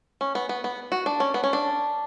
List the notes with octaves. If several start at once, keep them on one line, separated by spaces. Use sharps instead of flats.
C#4
B3
B3
B3
F#4
D4
C#4
B3
C#4
D4